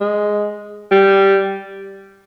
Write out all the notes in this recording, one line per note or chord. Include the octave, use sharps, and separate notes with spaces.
G#3
G3